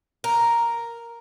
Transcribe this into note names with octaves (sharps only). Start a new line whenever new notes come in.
A#4